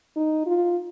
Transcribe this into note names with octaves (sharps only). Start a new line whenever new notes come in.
D#4
F4